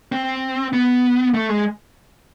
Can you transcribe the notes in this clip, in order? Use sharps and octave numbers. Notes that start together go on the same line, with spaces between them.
C4
B3
A3
G#3